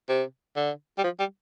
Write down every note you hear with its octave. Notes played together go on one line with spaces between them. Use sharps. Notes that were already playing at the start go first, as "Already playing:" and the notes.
C3
D3
G3
F3
G3